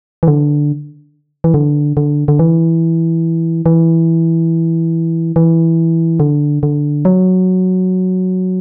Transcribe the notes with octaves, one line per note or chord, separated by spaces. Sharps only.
E3
D3
E3
D3
D3
D3
E3
E3
E3
D3
D3
F#3